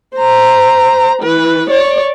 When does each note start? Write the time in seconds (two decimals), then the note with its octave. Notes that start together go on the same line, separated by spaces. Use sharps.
0.16 C5 A#5
1.23 E3 B4
1.70 C#5 D5